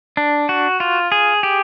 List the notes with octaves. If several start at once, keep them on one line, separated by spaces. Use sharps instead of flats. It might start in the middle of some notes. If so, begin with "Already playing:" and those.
D4
F#4
F4
G#4
G4